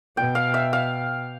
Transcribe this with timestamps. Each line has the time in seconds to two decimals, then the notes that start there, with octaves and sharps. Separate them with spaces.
0.17 B2 G5
0.35 F5
0.54 E5
0.73 F5